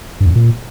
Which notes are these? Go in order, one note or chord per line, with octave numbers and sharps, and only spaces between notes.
G2
E2
F#2
A#2